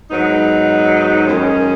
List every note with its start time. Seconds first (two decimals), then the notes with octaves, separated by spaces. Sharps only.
0.11 G#2 F#3 B3 D#4
1.26 F#2 D#3 G#3 C#4